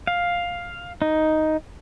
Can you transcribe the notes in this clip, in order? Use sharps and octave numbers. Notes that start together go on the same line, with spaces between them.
F5
D#4